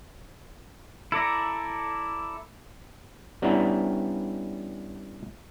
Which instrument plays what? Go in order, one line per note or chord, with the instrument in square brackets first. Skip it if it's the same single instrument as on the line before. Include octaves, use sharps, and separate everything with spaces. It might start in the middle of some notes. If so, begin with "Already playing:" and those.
[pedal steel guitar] E4 A4 D5 A#5
[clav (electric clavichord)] G3 B3 C#4 D4 E4 A#5